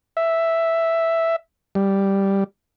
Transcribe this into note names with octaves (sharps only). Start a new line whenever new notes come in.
E5
G3